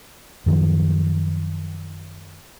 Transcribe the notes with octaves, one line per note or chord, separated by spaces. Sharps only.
F#2 D#3 F3